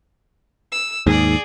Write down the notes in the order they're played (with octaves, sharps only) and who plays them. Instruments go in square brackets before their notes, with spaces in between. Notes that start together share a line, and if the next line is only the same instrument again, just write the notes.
[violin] E6
[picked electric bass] D#2 G#2 [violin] G#4 D5